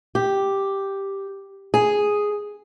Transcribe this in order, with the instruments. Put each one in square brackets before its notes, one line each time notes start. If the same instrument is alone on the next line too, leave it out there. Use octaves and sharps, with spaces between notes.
[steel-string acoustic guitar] G4
G#4